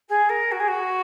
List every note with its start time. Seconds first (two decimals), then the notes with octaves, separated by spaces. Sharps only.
0.09 G#4
0.29 A#4
0.51 F#4
0.59 G#4
0.67 F#4